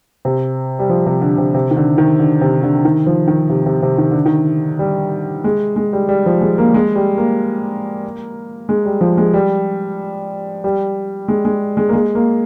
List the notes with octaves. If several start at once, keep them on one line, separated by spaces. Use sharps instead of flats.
C3
G3
F3
C3
D3
C3
C3
D#3
D3
D#3
D3
C3
D3
D#3
F3
D#3
C3
C3
C3
D#3
D3
D#3
G3
G#3
G#3
G3
G3
F3
G#3
A#3
G#3
G3
A#3
G#3
G3
F3
G#3
G3
G3
G#3
G#3
G#3
A#3
G#3
A#3